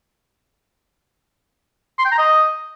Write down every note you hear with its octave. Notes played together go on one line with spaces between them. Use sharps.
C6
G5
A#5
D#5